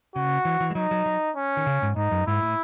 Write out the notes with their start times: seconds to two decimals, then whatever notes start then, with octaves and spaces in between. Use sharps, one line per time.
0.15 C#3 F#4
0.45 E3
0.60 E3
0.71 G#3
0.75 F#3 D#4
0.91 F#3
1.06 F#3
1.36 C#4
1.57 D#3
1.66 C#3
1.82 G#2
1.96 G#2 D#4
2.11 F#2
2.27 G#2 E4
2.43 A2